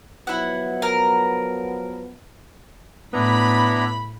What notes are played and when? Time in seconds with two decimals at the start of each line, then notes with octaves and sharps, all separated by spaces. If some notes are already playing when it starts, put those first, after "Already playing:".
0.27 F3 F#3 B3 E4 F#5
0.82 A#4
3.14 A2 B3 D4 E4 A#5 B5